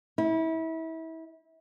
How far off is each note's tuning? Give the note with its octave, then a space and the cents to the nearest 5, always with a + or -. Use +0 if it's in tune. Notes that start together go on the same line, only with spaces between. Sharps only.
E4 -30